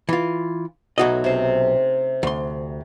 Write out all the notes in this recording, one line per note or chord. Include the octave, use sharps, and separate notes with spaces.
E3 F4
B1 A3 D#4 F#4 C#5 D#5
C3 C#4 C5
D2 C6